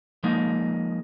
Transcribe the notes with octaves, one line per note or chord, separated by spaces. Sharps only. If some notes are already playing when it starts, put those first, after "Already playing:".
F3 G#3 A#3 D#4